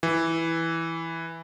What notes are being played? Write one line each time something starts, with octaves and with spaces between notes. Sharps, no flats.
E3